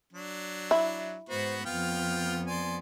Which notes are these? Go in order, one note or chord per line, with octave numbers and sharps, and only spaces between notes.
F#3 D4
E4
G#2 B3 F#4 C5
F2 B3 F4 G5 F6
D5 G#5 C6